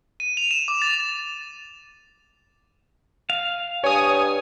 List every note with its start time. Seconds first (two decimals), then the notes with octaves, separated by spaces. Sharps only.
0.20 D#7
0.37 F7
0.51 E7
0.68 D6
0.82 A6
3.30 F5
3.84 G2 C#5 G#5 D#6